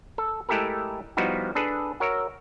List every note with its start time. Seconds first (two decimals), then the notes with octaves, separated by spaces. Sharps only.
0.18 A4
0.49 G#3 A3 E4 G4 A4 A#4
1.17 F3 G3 B3 D#4 E4 F#4
1.55 D4 G#4 A4 B4
2.00 F#4 A#4 C#5 E5